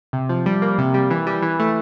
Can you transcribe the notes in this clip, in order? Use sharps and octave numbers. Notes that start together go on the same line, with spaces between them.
C3
F3
G3
A#3
C3
G3
E3
G3
E3
A3